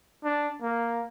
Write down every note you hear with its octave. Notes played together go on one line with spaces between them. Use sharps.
D4
A#3